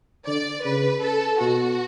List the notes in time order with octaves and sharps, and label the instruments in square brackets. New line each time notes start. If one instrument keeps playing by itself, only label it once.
[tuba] D3 [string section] D5
[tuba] C#3 [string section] B4
[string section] A4
[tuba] B2 [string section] F#4